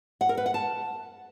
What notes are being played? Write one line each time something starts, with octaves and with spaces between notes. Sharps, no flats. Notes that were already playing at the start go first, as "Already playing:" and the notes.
F#5
A#4
B4
F#5
A5